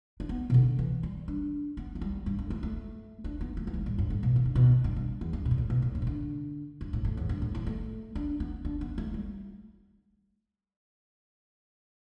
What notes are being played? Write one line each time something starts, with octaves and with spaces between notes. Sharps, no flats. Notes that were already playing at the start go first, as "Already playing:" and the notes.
D4
B3
B2
D3
E3
G3
D4
B3
A3
G3
G2
G2
A3
A3
D4
B3
A3
E3
G3
A2
G2
A2
B2
E3
D3
B2
G2
G2
E2
G2
B2
G2
A2
B2
A2
G2
B2
D3
G2
A2
A2
E2
G2
A2
E3
A3
D4
B3
D4
B3
A3
G3